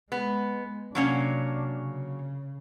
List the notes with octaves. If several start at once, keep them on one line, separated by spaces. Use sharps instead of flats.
G#3 B3
C3 F#3 A#3 C#4 D4
C#3